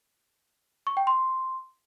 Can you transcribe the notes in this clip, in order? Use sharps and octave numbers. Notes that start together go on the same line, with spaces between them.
C#6
G5
C6